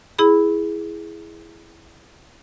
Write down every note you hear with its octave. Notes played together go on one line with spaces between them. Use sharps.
E4 G#4 B5